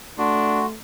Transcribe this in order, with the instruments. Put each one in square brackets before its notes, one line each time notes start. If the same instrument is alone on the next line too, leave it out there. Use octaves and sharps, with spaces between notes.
[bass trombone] A3 [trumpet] D4 [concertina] F#4 [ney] C6